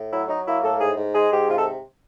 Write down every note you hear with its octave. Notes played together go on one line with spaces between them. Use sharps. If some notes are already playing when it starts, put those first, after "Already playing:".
Already playing: A2
F#3 E4
F#3 D#4
A#3 E4
A2 A4
G#2 G#4
G#2
G#3 G#4
G#2 G4
C3 F4
A4